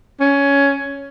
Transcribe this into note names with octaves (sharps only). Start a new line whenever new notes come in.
C#4